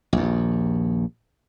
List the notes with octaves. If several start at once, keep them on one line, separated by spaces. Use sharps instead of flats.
A#1 D#2